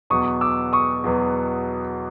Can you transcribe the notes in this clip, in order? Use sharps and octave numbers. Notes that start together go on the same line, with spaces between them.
E2 B2 F#3 B3 C#6 D#6
D6 E6
C#6 D#6
E2 B2 F#3 B3